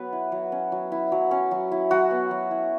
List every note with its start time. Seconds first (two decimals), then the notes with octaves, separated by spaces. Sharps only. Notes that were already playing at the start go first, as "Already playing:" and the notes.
Already playing: F#3 B3 B4
0.13 E4
0.32 F#3
0.52 C#4
0.72 F#3
0.92 E4
1.12 F#3
1.31 C#4
1.51 F#3
1.72 E4
1.91 F#3 F#4
2.11 B3
2.31 F#3
2.51 E4